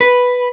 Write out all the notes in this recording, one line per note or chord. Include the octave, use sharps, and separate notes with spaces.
B4